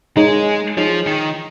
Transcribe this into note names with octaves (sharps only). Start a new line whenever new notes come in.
G#3 D#4 G#4 C#5
F3 D#4 G#4 C#5
D#3